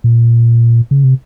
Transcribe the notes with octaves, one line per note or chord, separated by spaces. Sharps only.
A#2
C#3
C3